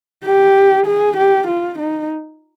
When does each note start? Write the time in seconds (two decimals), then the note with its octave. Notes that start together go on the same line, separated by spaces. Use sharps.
0.25 G4
0.86 G#4
1.17 G4
1.47 F4
1.79 D#4